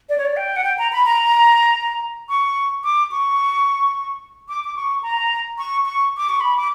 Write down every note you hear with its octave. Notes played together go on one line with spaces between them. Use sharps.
D5
C#5
D5
G5
F#5
G5
A#5
B5
A#5
C#6
D6
C#6
D6
D6
C#6
A#5
C#6
C#6
D6
C#6
B5
D6